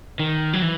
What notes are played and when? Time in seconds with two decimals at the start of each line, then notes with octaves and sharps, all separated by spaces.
0.19 D#3
0.53 F#3
0.62 E3